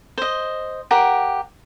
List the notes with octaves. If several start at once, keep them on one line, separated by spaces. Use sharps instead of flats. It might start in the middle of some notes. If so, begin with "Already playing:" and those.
C5 D#5
G4 A#4 F#5